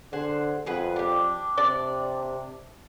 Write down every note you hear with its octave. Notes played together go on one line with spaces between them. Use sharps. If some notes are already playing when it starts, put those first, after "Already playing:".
D3 G#4 C5 F#5
F2 G#4 B4 F#5
D4 G4
C3 D5